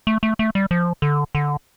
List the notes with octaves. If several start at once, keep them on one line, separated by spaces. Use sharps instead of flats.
A3
A3
A3
G3
F3
D3
D3